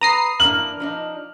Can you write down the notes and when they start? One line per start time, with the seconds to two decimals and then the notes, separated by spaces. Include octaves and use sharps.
0.01 B4 A#5 D#6 C7
0.40 E3 A#3 D4 F6 F#7
0.80 F3 D4 D#4